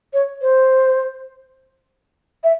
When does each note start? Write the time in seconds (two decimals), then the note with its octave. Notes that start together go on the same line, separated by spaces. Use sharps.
0.13 C#5
0.42 C5
2.44 E5